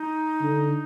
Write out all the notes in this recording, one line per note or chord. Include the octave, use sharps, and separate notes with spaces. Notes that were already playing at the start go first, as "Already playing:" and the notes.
Already playing: D#4
D3